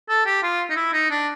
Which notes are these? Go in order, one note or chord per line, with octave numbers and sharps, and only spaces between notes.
A4
G4
F4
D#4
E4
D#4
D4